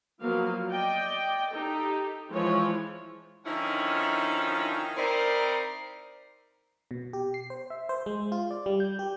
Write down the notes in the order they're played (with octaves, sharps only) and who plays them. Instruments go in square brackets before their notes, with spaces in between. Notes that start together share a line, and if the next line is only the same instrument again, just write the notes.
[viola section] F3 F#3 A#3 B3 F5
D5 D#5 G5
D#4 G4 A4
E3 F3 G#3 E4 C5 C#5
[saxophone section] D3 D#3 F3 C#4 D#4 E4
C4 D#4 E4 A#4 C5 D5
[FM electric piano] B2
G4
C7
C5
E5
C5
G#3
F4
D5
G3
G6
G4